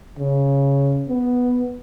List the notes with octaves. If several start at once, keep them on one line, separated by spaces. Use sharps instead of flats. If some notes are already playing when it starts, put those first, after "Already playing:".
C#3
B3